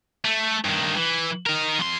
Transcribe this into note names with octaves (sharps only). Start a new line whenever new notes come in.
A3
G2 D#3
E3
D#4 A#4
F2 C6